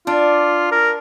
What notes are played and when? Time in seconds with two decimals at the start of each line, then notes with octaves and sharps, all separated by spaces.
0.07 D4 F4
0.71 A#4